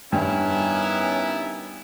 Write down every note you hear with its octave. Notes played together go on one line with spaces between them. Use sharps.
G2 D#3 B3 C#4 E4